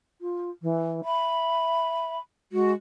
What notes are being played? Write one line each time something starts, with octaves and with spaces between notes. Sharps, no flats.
F4
E3
E5 B5
G#3 F#4